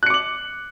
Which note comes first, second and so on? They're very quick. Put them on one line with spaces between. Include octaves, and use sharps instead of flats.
F#6 C#7 D6 F#7